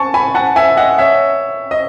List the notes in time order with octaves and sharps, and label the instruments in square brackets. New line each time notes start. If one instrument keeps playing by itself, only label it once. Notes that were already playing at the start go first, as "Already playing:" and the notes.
Already playing: [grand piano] G#5 A5 C#6
G#5 B5
F#5 A5
E5 G#5
D#5 F#5
C#5 E5
D#5